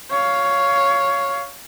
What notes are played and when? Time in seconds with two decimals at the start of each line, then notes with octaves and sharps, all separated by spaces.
0.11 C#5 F5